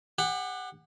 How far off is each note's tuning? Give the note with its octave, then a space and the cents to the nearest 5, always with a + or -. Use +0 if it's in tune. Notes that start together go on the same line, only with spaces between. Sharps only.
G4 +35 F#5 +0